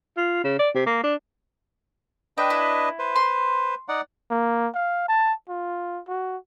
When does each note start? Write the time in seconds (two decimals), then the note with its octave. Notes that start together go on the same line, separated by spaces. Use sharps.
0.17 F4
0.44 C#3
0.59 D5
0.75 C3
0.86 A#3
1.03 D4
2.38 D4 B4 D#5 G5
2.50 E4
2.99 B4 C5
3.16 C6
3.88 D#4 D5 F#5
4.31 A#3
4.75 F5
5.08 A5
5.49 F4
6.09 F#4